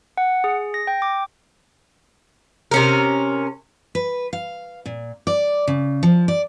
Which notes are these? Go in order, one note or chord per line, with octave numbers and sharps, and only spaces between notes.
F#5
G#4
A#6
G5
D6
C3 C#4 A#4
B4
F5
A#2
D5
C#3
F3
D5